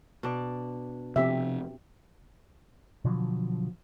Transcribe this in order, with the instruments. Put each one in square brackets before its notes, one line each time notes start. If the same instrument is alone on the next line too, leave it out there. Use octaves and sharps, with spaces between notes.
[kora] B2 D4 D5
[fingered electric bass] C3 F3 [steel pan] C4 G4 E5
[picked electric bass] B2 D3 F3 F#3